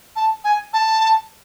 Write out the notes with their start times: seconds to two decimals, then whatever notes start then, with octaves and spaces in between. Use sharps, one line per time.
0.16 A5
0.44 G#5
0.73 A5